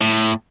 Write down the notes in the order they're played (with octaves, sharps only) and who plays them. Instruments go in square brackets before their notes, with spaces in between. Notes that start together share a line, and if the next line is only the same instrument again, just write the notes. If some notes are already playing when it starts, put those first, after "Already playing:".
[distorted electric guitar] A2